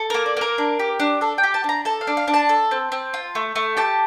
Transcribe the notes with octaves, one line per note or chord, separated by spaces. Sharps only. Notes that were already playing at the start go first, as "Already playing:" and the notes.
Already playing: A4
A#3 A#4
D5
A#3 A#4
D4
G4
D4
D4 A4
G5
G4
A5
D4 A#5
A4 A5
F5
D4
F5
D4
A5
A4
C4
C4
F4
A3
A3
G4 A5